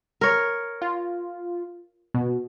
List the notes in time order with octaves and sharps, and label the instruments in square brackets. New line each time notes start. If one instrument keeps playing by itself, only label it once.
[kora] A#4 C#5
[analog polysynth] F4
B2